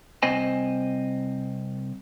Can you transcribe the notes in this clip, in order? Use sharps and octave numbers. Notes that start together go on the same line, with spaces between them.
C2 C4 C5 D#5 G#5